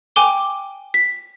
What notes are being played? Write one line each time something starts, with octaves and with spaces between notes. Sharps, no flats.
G5 G#5 D6 G7
B6